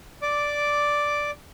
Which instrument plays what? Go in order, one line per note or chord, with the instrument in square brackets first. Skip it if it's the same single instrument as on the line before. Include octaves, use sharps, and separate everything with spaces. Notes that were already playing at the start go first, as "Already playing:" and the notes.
[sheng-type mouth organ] D5 D6